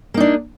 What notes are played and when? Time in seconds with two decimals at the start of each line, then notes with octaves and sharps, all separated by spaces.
0.14 A#3
0.17 D#4
0.20 D4